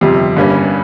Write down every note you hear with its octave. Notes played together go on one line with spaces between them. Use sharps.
G1 F2 C3 G3
G1 G2 G3 A#3 C#4